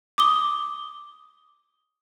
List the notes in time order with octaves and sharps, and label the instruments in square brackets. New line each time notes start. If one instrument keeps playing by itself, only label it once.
[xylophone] D6 D#6 G7